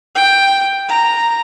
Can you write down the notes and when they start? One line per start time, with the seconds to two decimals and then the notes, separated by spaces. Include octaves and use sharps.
0.15 G5
0.89 A#5